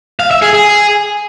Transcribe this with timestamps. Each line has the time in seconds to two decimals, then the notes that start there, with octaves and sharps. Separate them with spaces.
0.20 F5
0.31 E5
0.42 G#4
0.53 G#4